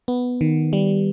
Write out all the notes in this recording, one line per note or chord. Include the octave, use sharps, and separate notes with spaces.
B3
D#3
G3